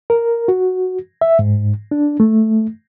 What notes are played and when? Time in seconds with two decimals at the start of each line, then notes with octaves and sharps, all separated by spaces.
0.10 A#4
0.48 F#4
1.21 E5
1.39 G#2
1.91 D4
2.20 A3